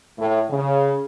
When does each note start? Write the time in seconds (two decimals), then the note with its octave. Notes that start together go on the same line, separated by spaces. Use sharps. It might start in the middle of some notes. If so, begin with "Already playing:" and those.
0.19 A2
0.50 C#3